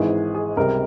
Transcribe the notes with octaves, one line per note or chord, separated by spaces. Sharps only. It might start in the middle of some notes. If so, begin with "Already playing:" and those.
Already playing: G#1 G#2 E3 G#3 G#4
G#4
C#2 C3 G3 A#4